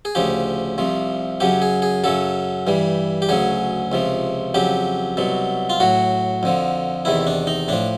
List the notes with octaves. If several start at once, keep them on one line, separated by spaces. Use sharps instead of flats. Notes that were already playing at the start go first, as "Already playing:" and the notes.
G#4
D2 C#3 F3 G4
C2 C3 F3
F#2 C#3 F#3 G4
G#4
G#4
F#2 C#3 F#3 A4
G2 E3 G3
G4
D2 C#3 F#3 G#4
C#2 C3 F3
F2 C#3 F#3 G4
C2 B2 F#3
F4
A2 F#3 F#4
F2 D3 F3
E2 C3 D#3 E4
D4
D#4
A2 F3 D4